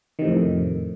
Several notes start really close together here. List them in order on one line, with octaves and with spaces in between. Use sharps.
D#3 C3 A2 F2